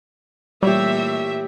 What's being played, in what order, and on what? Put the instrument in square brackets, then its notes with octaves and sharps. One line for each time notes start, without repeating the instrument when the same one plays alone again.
[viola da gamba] A#2 E3 A3 [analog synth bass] G3 [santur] G4 C#5 [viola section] E5